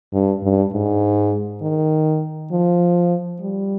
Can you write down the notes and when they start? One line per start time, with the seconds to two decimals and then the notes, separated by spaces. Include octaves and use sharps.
0.13 G2
0.43 G2
0.73 G#2
1.62 D#3
2.52 F3
3.41 G3